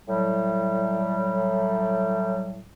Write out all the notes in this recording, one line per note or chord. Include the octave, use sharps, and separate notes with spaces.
A2 F#3 G3